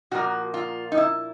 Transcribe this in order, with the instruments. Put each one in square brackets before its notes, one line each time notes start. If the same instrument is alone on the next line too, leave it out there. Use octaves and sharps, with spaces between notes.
[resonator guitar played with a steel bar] A#2 F3 A#3 F#4
F4
D#4
E4